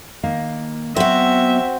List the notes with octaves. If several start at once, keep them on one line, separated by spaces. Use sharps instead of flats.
D#3 A#3 F5
F#3 B3 C4 F#4 E5